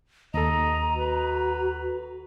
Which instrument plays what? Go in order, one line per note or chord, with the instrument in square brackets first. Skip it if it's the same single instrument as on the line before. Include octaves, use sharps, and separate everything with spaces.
[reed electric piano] D#2 A4 [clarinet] D#5 [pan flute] A#5
[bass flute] F#4 [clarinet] B4